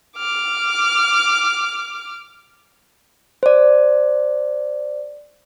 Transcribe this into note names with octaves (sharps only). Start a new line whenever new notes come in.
D6 F6
C5 D5